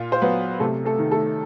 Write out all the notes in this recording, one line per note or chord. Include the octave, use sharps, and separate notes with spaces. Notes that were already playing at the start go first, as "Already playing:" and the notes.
Already playing: A#2 F4
C5
F#3 B3 B4
C3 A3 A4
A3 A4
D#3
A3 A4